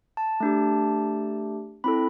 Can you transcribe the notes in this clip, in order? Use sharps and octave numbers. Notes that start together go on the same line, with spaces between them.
A5
A3 D4 G4
C4 E4 A4 B5